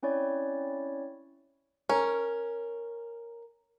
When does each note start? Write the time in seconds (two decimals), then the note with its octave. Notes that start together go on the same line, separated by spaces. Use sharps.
0.03 C4 C#4 E4 C#5 D5
1.89 C#4 A#4